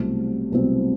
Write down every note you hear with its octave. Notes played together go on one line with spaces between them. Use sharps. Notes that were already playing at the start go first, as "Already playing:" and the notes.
Already playing: C2 B2 F#3 A3 C4
C2 B2 F#3 A3 C4